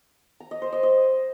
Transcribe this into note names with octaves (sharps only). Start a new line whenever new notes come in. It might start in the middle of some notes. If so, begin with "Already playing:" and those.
A#5
D#5
C5
D#5
D#5